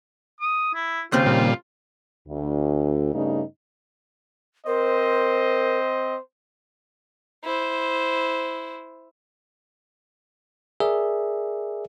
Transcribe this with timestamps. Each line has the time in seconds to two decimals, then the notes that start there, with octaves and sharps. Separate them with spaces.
0.40 D#6
0.74 E4
1.12 D#2 C#3 C4 F4
1.26 A#2 G3
2.28 D2
3.13 G2 C#3 A3 D#4
4.67 C4 A#4 C5 D#5
7.44 E4 C5
10.80 G#4 A#4 D5 E5